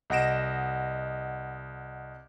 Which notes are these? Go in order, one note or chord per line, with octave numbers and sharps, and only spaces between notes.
C2 D#5 F#5 A#6 D7 E7